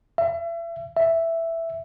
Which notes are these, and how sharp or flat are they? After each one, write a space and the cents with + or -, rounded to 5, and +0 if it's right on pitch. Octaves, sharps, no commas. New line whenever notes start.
E5 +35
E5 +5